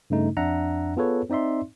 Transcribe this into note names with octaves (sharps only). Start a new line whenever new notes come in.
G2 C#3 A3 D#4
F2 D4 E5 F#5 A#5
B3 F4 G#4 A4 B4 C#5
C4 D#4 D5 E5 C6